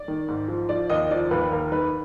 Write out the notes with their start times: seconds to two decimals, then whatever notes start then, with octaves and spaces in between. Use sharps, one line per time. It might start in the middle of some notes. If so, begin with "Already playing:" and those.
Already playing: D5
0.08 D#3
0.28 G#2
0.48 F3
0.69 F3 D5
0.90 D#2 D#5
1.11 F3 D5
1.31 D#2 B4
1.51 D#2 A#4
1.72 D#3 B4